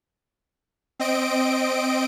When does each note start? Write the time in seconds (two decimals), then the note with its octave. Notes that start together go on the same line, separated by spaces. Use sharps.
0.99 C4 D#5 D7